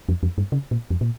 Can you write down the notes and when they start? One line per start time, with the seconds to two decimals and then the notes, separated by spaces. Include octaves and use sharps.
0.09 F2
0.23 F2
0.38 G2
0.52 C#3
0.71 A#2
0.90 F2
1.01 A#2